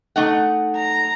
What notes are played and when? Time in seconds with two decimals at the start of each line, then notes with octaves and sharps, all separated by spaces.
0.16 A3 D#4 F#5
0.76 A#5